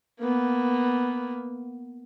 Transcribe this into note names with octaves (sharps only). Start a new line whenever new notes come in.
A#3 B3